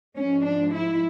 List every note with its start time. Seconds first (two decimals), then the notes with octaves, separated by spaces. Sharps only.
0.16 G#2 F3 G#3 C#4
0.44 D4
0.73 E4